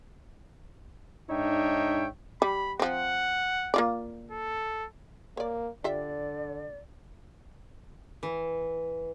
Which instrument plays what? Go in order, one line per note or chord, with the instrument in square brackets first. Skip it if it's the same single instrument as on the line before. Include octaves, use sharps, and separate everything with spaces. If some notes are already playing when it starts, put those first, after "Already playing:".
[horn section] G#2 D4 D#4 C#5 E5 G5
[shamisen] G3 [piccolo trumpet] B5
[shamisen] F3 C4 [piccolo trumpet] F#5
[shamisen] A#3 F4 D5
[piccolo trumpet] A4
[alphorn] A#3 [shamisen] C#5 D5
[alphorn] D3 [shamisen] F4 G4 E5 [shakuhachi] D5
[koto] E3